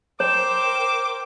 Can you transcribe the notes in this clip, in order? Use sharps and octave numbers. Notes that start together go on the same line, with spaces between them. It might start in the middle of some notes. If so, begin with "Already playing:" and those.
A#4 C5 C#5 G5 D6 E7